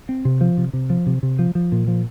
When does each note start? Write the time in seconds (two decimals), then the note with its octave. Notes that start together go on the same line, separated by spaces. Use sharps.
0.09 C4
0.25 C3
0.41 F3
0.58 C3
0.73 C3
0.90 F3
1.06 C3
1.23 C3
1.39 F3
1.55 F3
1.72 A#2
1.88 F3